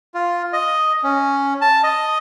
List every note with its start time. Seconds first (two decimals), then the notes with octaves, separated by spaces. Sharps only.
0.14 F4
0.53 D#5
1.04 C#4
1.61 A5
1.83 D#5